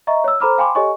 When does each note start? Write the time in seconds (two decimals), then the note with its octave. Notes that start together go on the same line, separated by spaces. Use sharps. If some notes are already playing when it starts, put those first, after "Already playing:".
0.07 D#5 E5 A#5 C#6
0.24 C#5 E6
0.40 A4 C5 A#5 B5 D6 F6
0.58 F5 G5 G#5 B5 C6 D6
0.75 G4 A4 C#5 D#5 G#5 C#6